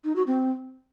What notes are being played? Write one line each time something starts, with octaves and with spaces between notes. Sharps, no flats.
D#4
F#4
C4